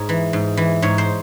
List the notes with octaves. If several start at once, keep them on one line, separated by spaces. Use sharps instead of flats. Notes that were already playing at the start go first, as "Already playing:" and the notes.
Already playing: G#2 C#5
E3
G#2
E3
G#2 C#5
C5